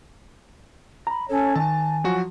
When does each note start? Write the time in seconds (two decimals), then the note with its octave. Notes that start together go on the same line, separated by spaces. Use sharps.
1.07 A#5 B5
1.28 C#4 A4 C#5
1.56 D#3 G#5 A5
2.04 F3 F#3 F#4